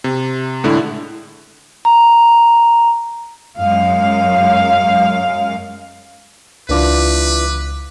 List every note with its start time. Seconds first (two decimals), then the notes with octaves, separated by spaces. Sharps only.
0.04 C3
0.64 A2 D3 G#3 E4
1.85 A#5
3.59 F#2 G#3 F5
6.69 C#2 E3 D4 F4 B4 D6